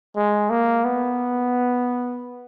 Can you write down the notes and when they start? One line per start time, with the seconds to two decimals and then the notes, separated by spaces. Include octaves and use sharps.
0.16 G#3
0.50 A#3
0.85 B3